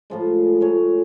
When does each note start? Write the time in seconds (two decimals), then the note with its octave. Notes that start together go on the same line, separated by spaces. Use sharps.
0.10 A2 F3 G#3
0.61 A2 F3 G#3 C#5